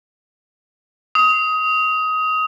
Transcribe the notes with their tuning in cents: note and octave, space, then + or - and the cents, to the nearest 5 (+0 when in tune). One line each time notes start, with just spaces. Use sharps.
D#6 +20